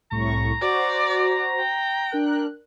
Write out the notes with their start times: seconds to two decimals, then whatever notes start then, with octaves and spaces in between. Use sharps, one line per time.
0.11 C2 A2 A#5 C#6
0.62 F#4 C5 D5
1.59 G5
2.11 D4 A#4 F#6